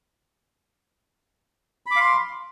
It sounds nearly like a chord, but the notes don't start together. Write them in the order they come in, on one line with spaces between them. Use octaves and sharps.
B5 D6 F5 C6